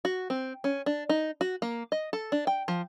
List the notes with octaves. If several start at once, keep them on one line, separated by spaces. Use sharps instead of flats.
F#4
C4
C#4
D4
D#4
F#4
A#3
D#5
A4
D4
G5
F3